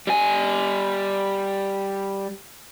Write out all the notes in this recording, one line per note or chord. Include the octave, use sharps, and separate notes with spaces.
G3 G#5